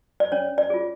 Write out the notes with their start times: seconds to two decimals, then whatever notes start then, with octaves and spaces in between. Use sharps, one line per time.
0.20 D5
0.32 C#4 C#5
0.58 D5
0.70 F4 G#4